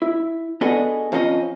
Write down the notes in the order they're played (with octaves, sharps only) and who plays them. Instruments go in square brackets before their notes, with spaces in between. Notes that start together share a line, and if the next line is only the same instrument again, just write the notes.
[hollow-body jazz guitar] E4
B3 D4 F#4 G#4 A4 D#5
F2 F3 C#4 G#4 D#5